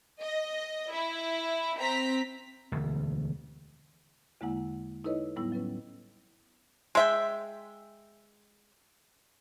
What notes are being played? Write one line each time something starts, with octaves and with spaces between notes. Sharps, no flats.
D#5
E4
C4 A#5 B6
E1 D2
E2 D3 G#3 A#3 E4 F#5
D#4 E4 A4 B4 C#5 D#5
A2 F#3 G3 B3 E4 E6
F#3 C#4 B4
G#3 E5 G5